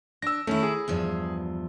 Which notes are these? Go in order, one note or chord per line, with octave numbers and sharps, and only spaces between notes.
D4 E6 A#6
D#3 A3 C#4 E4
G#4
E2 G2 F3